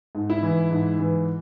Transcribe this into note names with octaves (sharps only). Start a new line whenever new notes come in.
G#2
E4
E3
G#2
E3